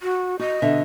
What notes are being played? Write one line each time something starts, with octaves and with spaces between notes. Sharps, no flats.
F#4
F#4 D#5
B2 D3 E5